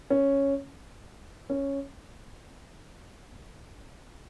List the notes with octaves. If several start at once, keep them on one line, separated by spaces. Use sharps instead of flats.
C#4
C#4